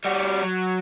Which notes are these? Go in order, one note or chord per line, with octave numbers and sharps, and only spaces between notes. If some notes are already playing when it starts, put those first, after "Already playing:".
G3 F#4
F#3